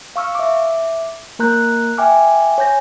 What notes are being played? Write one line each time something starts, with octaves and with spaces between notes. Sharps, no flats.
F5 C#6 E6 F6
E5 D6
A#3 A#4 A#5 F#6 G6
E5 G5 G#5 D6 F6
C#5 G#5 G6 A#6